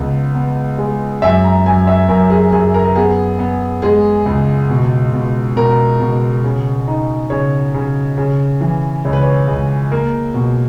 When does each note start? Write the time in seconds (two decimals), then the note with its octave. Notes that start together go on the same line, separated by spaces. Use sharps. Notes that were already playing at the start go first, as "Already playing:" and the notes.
Already playing: C#2 B3
0.35 B3
0.78 G#3
1.22 F#2 E5
1.44 A#5
1.66 F#2 G#5
1.87 E5
2.09 F#2 A#4
2.30 G#4
2.52 F#2 G#4
2.74 A#4
2.85 A#4
2.96 B3 G#4
3.39 B3
3.82 G#3 G#4
4.26 C#2
4.69 B2
5.13 B2
5.56 B2 A#4
6.00 B2
6.44 C#3
6.88 D#4
7.30 C#3 C#5
7.74 C#3
8.18 C#3
8.61 E3
9.05 C#2 C#5
9.13 B4
9.22 C#5
9.48 C#2
9.91 A#3 A#4
10.34 B2